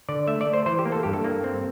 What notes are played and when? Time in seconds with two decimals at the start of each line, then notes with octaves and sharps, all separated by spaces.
0.09 D3 D5
0.27 A3 E5
0.41 D5
0.46 A3
0.54 C5
0.66 E3 C5
0.79 G4
0.85 A#3
0.92 A4
1.03 G2 G4
1.13 A4
1.24 A#3
1.44 C4